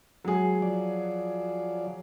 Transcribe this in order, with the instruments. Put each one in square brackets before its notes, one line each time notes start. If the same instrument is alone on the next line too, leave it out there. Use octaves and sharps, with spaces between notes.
[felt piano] F#3 G#4 [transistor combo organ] G#3
[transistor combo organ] F3 D5